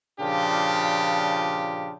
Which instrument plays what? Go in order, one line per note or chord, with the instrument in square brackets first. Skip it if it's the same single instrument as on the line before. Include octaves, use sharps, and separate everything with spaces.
[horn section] A#2 C#3 F3 D4 F4 G4